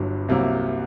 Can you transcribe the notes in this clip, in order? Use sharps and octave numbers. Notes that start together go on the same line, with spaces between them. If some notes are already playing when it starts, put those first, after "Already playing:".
Already playing: G1 G2 F#3
C2 C3 F#3 A#3